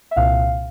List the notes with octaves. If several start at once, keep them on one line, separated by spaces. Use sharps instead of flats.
E5
C2 A#2 F5